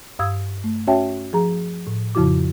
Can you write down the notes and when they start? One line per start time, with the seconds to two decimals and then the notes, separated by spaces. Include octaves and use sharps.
0.19 G2 F5 D#6 E6 G#6
0.64 A3
0.87 C#4 F#4 C#5 E5 G5 A5
1.33 F3 G#4 A#5
1.87 A2
2.15 F2 C#3 F3 E4 F#4 D6